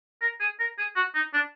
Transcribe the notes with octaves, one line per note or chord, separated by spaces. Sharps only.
A#4
G#4
A#4
G#4
F#4
D#4
D4